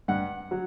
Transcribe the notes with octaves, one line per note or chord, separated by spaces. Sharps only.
G2 F#5
F#3